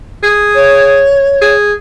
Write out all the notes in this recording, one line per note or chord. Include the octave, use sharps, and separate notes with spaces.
G#4
C#5
G#4